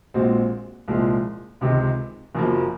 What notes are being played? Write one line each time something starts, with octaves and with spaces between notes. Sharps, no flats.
A#1 A#2 G#3 C4 F#4
C2 A#2 F3 G#3
C#2 C3 D#3 G#3
F#1 F#2 F3 A#3